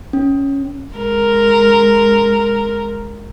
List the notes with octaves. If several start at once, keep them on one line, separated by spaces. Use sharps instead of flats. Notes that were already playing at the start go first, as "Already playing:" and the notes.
C#4
G#3 A#4